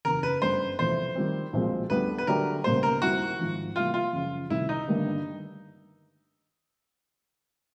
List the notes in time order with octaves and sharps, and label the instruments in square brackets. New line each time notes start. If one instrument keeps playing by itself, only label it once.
[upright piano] F#1 E2 C#3 [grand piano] A#4
[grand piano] B4
[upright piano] G1 F#2 D3 G3 [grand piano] C5
[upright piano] E1 E2 C3 F3 A3 [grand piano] C5
[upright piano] D#3 G3 C4
B1 A#2 F3 G#3 C4
[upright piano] D2 D3 G3 B3 [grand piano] B4
[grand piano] B4
[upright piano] D3 F#3 A3 D4 G4 [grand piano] A#4
[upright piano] C#2 B2 G3 A#3 [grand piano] C5
[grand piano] A#4
[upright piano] D#2 D#3 G3 C4 E4 [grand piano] F#4
[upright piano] G#1 G#2 F3
[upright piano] C3 E3 G3 A#3 [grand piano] F4
[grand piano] F4
[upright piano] F#2 C#3 F3
[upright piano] C2 C3 D#3 G3 [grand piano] E4
[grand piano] D#4
[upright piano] G1 G2 D#3 G3 A#3